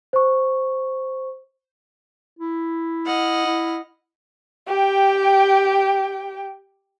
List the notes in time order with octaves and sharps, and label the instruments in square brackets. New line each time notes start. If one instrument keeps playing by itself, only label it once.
[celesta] C5 C#6
[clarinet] E4
[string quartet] D#5 F#5 F6
[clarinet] E4
[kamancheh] G4 G5